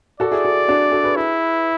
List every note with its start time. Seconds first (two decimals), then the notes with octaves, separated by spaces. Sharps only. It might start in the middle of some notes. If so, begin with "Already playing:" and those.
0.20 F#4 A4 D5
0.32 E4 G#4
0.45 F#4 A4
0.68 D4 F#4
0.92 F#4 A4
1.04 G#4 B4
1.16 E4